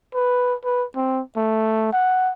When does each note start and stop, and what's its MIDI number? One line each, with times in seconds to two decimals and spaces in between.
0.15 0.55 71
0.64 0.85 71
0.95 1.21 60
1.36 1.90 57
1.93 2.32 78